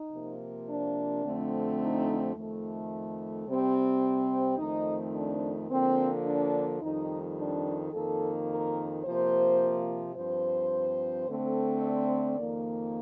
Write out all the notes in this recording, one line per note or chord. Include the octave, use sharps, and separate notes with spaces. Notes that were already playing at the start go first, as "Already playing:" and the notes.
Already playing: D#4
C3 F3 A#3
D4
F2 D3 A3 C4
D#4
F2 D#3 A3
C3 G3 C4
F2 D#3 A3 C4 D#4
D4
D3 F3 A#3 C4
D4
F2 D#3 G3 D#4
D4
F2 D#3 A#3 A4
A#4
C3 F3 A#3 C5
G2 F3 C4 C5
D3 A3 C4
D5
F2 D#3 A#3